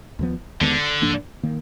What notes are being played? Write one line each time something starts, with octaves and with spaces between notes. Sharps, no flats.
D#2 D3 F3 B3
D#2 D3 D#3 G#3 B3
G#2 F3 A#3 D4
D#3 A#3